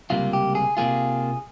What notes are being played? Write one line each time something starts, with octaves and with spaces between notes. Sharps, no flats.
C#2 C3 G3 A#3 F4
G4
G#4
C3 D#3 A#3 F4 G#4